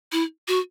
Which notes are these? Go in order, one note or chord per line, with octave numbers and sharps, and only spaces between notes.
E4
F#4